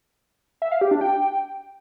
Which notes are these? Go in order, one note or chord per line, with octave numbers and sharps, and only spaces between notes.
E5
F5
G4
D4
G5